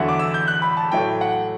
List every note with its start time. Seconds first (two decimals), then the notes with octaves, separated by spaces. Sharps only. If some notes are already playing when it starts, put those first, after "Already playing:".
Already playing: E2 D3 F#3 A3 E5 F#5
0.08 D6
0.19 E6
0.34 G6
0.48 F#6
0.62 B5
0.77 A5
0.91 A2 F#3 A3 G5
1.21 F#5